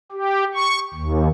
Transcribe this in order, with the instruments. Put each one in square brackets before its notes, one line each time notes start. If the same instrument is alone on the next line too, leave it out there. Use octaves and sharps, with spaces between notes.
[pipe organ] G4
C#6
D#2